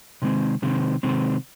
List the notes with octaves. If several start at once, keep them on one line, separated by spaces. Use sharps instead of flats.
C3 D#3 G#3 C4
C3 D#3 G#3 C4
C3 D#3 G#3 C4